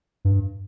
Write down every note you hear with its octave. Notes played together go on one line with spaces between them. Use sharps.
G2